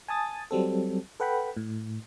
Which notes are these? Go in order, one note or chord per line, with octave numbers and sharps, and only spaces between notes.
G#5 A5 D#6 A6
F#3 G3 C4 A4
A4 B4 F#5 G5 B5
A2